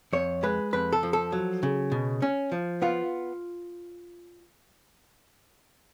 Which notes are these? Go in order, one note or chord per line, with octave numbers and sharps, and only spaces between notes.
F2 C#5
G#3 B4
F2 B4
A4
F3
A4
F#3
C#3
B2
C#4
F3
B3 F4